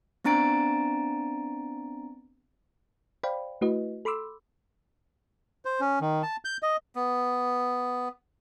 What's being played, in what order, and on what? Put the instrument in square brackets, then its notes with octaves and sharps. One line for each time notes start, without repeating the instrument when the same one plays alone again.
[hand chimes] B3 C4 D4 A#5 A6 D7
[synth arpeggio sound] C5 D5 F5 G5 B5
A3 E4 F#4 B4 D#5
A4 B5 C6 D6 E6
[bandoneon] C5
C#4
D#3
A5
G6
D#5
[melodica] B3